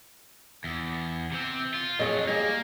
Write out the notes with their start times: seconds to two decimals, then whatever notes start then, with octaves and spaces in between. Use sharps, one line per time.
0.64 E2
1.32 C3 C4
1.74 F4
1.99 F2 F#3 G#4 C#5 D#5
2.28 G3 A#3 G#4